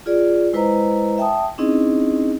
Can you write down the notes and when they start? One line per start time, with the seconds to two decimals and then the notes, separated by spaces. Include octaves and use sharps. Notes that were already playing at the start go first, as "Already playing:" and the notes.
0.06 F4 G#4 D5
0.53 G#3 E4 B4 C5 D#5 A#5
1.18 E5 G5 A5 D#6
1.58 C4 C#4 D#4 E4 G#4 D#5